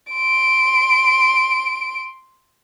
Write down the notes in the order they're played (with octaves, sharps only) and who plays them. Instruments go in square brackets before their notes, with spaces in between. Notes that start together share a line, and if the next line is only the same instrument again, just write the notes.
[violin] C6 D7